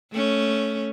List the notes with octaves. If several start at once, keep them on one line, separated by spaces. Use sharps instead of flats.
A3 C#4